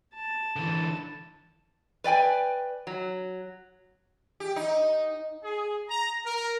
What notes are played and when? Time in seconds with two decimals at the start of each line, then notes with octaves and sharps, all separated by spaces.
0.14 A5
0.56 D3 E3
2.04 B4 D5 G5 G#5
2.87 F#3
4.40 G4
4.56 D#4
5.44 G#4
5.90 A#5
6.25 A#4